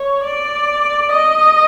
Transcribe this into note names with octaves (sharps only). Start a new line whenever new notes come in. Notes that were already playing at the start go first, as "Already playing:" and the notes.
Already playing: C#5
D5
D#5